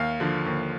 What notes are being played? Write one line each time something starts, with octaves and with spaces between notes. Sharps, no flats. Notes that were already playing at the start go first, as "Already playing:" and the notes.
Already playing: D#2 F5
D3 F3
D#2